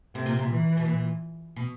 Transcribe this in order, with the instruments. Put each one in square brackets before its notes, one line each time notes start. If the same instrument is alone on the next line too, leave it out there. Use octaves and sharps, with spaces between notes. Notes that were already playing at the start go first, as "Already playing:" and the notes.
[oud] A2 [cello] C3
[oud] A#2
A#2
[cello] E3
[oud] B2
A#2
B2